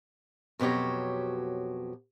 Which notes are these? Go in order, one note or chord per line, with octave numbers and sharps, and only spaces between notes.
F2 B2 F#3 G4 C#5